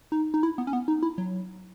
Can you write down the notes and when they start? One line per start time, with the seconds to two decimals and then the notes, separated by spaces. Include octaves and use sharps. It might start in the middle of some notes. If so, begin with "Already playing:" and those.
0.12 D#4
0.34 D#4
0.43 E4
0.58 B3
0.67 C#4
0.73 B3
0.88 D#4
1.03 E4
1.18 F#3